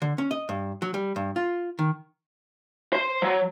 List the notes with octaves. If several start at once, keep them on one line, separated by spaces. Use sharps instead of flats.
D3
C#4
D#5
G2
F#3
G3
G2
F4
D#3
C5 C6
F#3